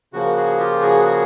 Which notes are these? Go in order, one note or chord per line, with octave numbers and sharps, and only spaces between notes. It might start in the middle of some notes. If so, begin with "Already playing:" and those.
C#3 F3 A#3 F#4
F#4 G#4
F4 G4
F#4 G#4
F#4 G#4